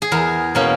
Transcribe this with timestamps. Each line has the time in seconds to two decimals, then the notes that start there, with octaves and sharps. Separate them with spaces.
0.02 G#4
0.12 E2 A#4
0.55 B2 A#3 C#4